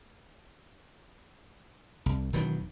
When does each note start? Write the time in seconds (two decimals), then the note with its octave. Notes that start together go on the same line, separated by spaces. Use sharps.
2.06 C2
2.33 E1 D#3 E3 F#3